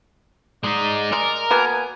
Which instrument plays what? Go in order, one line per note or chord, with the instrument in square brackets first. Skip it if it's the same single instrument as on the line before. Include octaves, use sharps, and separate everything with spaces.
[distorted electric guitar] G#3 D#4 [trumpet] D5
[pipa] G#3 [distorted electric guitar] A#4
[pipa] B2 A#3 B3 [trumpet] G#5